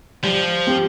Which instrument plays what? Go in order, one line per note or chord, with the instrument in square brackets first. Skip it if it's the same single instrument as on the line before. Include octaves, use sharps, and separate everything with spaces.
[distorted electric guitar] F3 [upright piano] G3
[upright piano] C4 G4